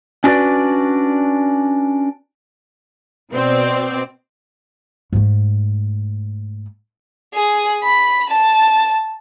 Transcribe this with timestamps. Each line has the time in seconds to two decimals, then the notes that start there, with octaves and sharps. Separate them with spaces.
0.24 C#4 D4 F#4 A4 B4 D5
3.32 B2 C4 D5
5.13 G#2 A3
7.34 G#4
7.83 B5
8.30 A5